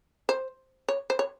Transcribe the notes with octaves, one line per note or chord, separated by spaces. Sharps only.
C5
C#5
C5
C#5